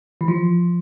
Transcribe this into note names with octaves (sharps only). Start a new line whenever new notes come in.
E3
F3